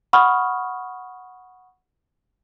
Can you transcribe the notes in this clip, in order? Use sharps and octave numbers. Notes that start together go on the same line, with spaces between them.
F#5 B5 C#6 D#6 F6